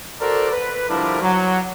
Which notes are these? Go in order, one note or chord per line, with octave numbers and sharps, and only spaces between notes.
F#4 A4 A#4 C5 D5
B4
D3 F3 G3 D4 E4 A#4
F#3